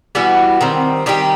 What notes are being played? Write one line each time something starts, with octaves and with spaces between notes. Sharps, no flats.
E3 G3 B3 F#4
D#3 G3 C4
D#3 G3 D#4 G4